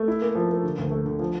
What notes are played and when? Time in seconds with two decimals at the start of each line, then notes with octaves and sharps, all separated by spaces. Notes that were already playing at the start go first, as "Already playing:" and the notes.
Already playing: A3
0.08 E4
0.21 A#3
0.35 F3
0.49 A#3
0.63 D3
0.78 D2
0.91 A3
1.06 D3
1.19 F3